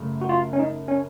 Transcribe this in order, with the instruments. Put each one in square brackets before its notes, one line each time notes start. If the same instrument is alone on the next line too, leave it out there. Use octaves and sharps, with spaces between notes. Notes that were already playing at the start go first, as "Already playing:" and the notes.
Already playing: [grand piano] F#2 C#3 A3
[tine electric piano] F#4
F4
C#4
D#4
C#4